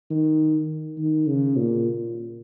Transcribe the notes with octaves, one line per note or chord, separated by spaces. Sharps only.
D#3
D#3
C#3
A#2